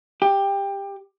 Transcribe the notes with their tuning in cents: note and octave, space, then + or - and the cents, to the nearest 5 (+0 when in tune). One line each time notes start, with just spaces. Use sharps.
G4 +15